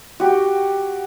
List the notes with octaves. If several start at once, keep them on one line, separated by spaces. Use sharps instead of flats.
F#4 G4